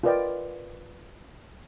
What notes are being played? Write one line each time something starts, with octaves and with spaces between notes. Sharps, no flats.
F4 A#4 B4 D5 D#5 G5